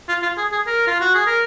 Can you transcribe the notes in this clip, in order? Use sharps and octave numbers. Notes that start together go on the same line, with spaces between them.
F4
F4
G#4
G#4
A#4
F4
F#4
G#4
A#4